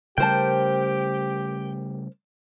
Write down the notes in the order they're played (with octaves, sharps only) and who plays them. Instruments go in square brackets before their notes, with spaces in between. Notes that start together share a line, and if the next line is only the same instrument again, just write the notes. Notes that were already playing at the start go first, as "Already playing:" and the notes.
[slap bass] C#3 G3 A3 [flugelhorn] G4 [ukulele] A#4 C5 A5 [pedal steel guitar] G5